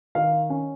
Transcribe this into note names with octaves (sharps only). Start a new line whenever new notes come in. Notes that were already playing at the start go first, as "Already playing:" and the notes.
D#3 F5
C#4